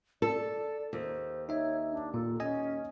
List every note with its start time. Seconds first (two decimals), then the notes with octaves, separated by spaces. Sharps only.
0.22 A4 D5
0.93 D#2 C5
1.49 D#4 C#5 E5
1.91 D4
2.14 A#2 A4
2.40 C#4 D#5 G#5